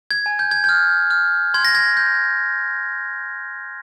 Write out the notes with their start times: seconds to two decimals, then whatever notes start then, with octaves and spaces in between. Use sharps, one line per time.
0.11 G#6
0.26 G#5
0.39 G6
0.51 G#6
0.64 F6 G6
1.11 F6
1.54 C6 G#6
1.65 A#6
1.75 G#6
1.97 G6